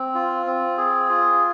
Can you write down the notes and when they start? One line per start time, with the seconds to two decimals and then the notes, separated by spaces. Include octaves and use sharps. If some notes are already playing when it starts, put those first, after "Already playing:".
Already playing: C4
0.15 F4
0.46 C4
0.78 G#4
1.09 F4